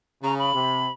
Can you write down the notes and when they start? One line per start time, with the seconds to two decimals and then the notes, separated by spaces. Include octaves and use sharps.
0.23 C#3 A#5
0.39 B5
0.54 C3